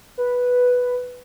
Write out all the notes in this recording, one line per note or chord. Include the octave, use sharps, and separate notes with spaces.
B4